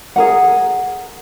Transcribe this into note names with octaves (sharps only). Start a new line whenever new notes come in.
G#4 A#4 F#5